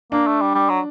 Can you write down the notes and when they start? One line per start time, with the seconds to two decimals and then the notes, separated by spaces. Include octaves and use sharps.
0.12 A#3 D4
0.27 A3
0.41 G3
0.55 G3
0.70 F#3